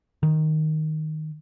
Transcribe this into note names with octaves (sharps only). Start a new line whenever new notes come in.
D#3